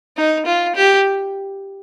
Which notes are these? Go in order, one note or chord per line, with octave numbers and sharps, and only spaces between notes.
D#4
F4
G4